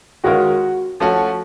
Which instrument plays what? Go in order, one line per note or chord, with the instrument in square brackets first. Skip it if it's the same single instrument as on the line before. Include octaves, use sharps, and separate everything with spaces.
[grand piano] D#3 G#3 C#4 F4 A#4 [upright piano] F#4
[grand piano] F3 A3 C#4 F#4